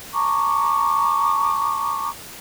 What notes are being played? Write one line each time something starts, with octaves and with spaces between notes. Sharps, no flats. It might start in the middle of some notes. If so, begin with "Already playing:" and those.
A5 A#5 C#6 D6